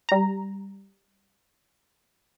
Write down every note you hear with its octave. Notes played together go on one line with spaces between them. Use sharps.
G3 A#5